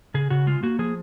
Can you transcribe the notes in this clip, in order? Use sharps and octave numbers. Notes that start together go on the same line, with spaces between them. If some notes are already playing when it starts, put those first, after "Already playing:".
C#3 G#4
C#3 F#4
G#3 F4
A#3 F#4
F3 G#4